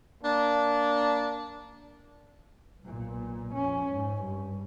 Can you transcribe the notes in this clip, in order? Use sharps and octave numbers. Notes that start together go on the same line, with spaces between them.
A#3 D4
B1 A#2
F2 C#4
G#2
G2